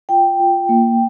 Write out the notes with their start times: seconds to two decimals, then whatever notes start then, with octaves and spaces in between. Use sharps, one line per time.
0.09 F4 G5
0.40 F4
0.69 A#3